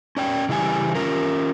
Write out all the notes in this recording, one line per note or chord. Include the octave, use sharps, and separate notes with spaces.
C#4 D5 G5
C#3 E3 G3 G#5
C#4 F4 A#4